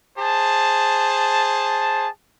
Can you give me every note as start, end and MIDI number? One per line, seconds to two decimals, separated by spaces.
0.17 2.08 68
0.17 2.08 72
0.17 2.08 81